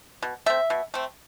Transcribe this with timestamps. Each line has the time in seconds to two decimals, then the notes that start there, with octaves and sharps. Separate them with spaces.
0.22 B2
0.46 A3 C4 E5
0.70 B2
0.94 A3 C4